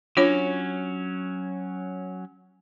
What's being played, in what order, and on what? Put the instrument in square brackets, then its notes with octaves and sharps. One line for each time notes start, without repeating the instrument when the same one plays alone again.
[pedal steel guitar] F#3 C#4 [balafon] D4 F4 C#5